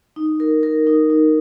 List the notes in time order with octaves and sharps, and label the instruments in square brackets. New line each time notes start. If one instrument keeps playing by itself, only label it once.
[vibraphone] D#4
A#4
A#4
D#4
D#4